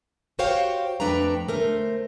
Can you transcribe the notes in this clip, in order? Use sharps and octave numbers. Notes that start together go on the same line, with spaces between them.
F#4 G4 C5 C#5 F5 G5
F2 A3 D4 B4 G5 A#5
A3 A#4 C5